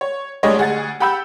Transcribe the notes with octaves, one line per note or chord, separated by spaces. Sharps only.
C#5
A2 G3 G#3 D4 C#5 D#5
D2 G#4 F#5 A6
G4 F#5 B5 E6 G6